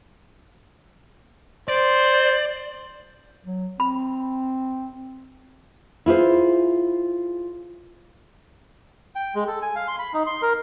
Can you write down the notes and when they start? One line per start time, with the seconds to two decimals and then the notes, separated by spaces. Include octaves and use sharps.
1.69 C5 D5
3.45 F#3
3.80 C4 B5
6.06 E4 F4 G#4 C5
9.15 G5
9.35 G#3
9.48 A4
9.62 G#5
9.76 F5
9.88 C6
9.99 B5
10.14 D#4
10.27 C6
10.42 A#4